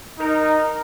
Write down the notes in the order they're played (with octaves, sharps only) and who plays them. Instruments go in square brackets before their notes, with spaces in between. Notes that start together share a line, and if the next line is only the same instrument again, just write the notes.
[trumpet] D#4 [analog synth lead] A#4